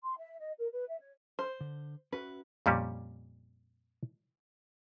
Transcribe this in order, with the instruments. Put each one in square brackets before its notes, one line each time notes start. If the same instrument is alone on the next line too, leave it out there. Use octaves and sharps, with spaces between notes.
[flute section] C6
E5
D#5
A#4
B4
E5
C#5
[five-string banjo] C5
[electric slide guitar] D3
[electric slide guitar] C#4 F#4 E5 [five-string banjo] B4
[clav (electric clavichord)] F2 A#2 G3 C#4